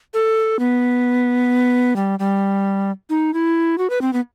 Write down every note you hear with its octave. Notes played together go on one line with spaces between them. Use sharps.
A4
B3
G3
G3
D#4
E4
F#4
B4
C4
B3